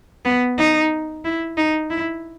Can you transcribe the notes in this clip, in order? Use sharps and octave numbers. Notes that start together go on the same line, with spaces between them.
B3
D#4
E4
D#4
E4